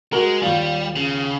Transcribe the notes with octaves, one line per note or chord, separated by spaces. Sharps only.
G#3 F#4 A#4
D#2 G3 F4
C#3